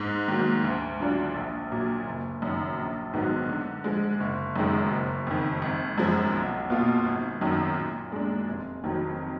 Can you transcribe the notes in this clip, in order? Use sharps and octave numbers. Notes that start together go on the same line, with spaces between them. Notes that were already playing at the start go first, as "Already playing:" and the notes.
Already playing: G#2
D#3 F#3 A#3
D2
D3 F#3 D4 F4
A#1
A#2 F#3
F#1
F#2 D#3
A#1
G#2 D#3 F#3 B3
D3
F3 G#3
F#1
F#2 D#3 G#3
F#1
F2 D#3
G#1
F#2 F3 G#3
B1
B2 A#3 F4
G#1
F#2 D#3 F#3
A#2
G#3 D4
F1
F2 D#3 F#3